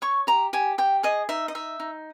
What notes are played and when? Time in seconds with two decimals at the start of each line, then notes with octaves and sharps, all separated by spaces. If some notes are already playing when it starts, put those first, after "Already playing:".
0.02 C#5 C#6
0.27 G4 A#5
0.53 G4 G#5
0.78 G4 G5
1.03 G#4 D#5
1.29 D#4 E5
1.48 D#5
1.55 D#4 E5
1.80 D#4